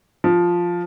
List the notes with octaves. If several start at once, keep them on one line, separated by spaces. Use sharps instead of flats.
F3